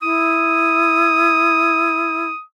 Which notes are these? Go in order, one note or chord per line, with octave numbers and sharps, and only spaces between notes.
E4 D#6